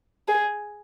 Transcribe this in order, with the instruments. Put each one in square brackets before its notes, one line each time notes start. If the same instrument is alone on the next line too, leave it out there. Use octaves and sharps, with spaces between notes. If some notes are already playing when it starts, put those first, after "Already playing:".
[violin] G#4